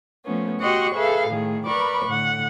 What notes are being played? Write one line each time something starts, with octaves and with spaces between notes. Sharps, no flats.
F3 A3 B3 C#4
F#4 G4 D#5 F#5 C6 C#6
G#4 A4 B4 E5 F5
A2 D#3 A3 G#4
A#4 B4 D5 B5 C#6 D6
A2 D3 F#5